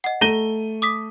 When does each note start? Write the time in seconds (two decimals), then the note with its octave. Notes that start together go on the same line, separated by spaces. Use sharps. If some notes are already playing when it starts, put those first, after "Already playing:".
0.04 D#5 F#5
0.21 A3 A#5 A#6 D#7 F#7 G7
0.82 D6 D#6 B6